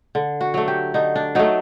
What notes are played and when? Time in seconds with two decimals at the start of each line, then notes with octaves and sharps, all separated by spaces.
0.15 D3
0.41 F#4
0.54 F#3 A3
0.68 G4
0.94 D3 D#4
1.16 D4
1.35 F#3 A3 D#4